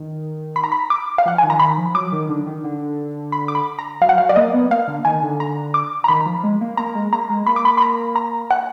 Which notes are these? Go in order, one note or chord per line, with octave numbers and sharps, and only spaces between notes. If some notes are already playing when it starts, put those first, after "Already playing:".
Already playing: D#3
B5
A#5
B5
D6
F5
F3 F#5
D#3 G#5
A#5
D#3 B5
F3
F#3 D6
D#3
D3
D#3
D3
B5
D6
B5
A#5
F#3 F5
F#5
F#3 F5
D5
A#3 D#5
B3
A#3 F5
D3
D#3 G#5
D3
A#5
D6
A#5
D#3 B5
F3
G#3
A#3
A#3 A#5
G#3
A#3 A#5
G#3
A#3 B5
D6
B5
B5
A#5
A#5
F#5